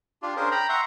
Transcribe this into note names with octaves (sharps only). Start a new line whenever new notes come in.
D4 F4 G4
C#4 D4 G#4 A#4 C5
G5 A#5 B5
E5 F#5 A#5 C6 C#6